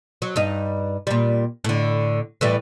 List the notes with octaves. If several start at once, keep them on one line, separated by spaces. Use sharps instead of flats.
F#3
G2 D#4
A#2 G3
A2 D3
A2 E3 G3